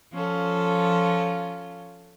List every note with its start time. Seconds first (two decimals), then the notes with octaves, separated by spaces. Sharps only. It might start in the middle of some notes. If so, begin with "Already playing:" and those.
0.13 F3 C#4 F4 A4